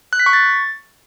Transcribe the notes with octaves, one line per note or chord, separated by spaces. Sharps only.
F#6
B6
C#6
A6